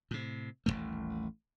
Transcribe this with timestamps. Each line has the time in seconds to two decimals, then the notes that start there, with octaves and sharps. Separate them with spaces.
0.11 A2 C3
0.66 D#1 A1 A#2 A3